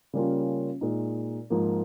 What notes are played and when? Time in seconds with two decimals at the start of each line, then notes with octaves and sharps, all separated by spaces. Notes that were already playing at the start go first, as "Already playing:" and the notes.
0.13 C#3 G3 A#3 C#4 F4
0.81 A#2 G#3 D#4
1.50 G#2 F3 A#3